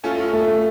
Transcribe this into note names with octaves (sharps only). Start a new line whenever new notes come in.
A3 C#4 F4 A4
A3